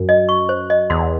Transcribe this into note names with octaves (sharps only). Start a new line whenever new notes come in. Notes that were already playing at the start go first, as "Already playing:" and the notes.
Already playing: F#2
D#5
C#6
C5
D#5
E2 C6